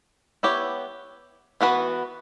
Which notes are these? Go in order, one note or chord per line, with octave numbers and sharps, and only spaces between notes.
B3 E4 G4 C#5
E3 B3 F#4 B4